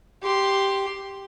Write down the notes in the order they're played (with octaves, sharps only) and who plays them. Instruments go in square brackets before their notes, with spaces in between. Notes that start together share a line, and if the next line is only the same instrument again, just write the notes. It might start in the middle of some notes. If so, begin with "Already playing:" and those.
[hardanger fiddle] G4 C6